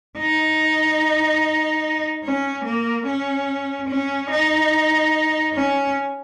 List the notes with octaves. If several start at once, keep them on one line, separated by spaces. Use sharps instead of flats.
D#4
C#4
A#3
C#4
C#4
D#4
C#4